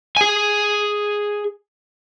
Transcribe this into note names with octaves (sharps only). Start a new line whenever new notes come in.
G#4 G#5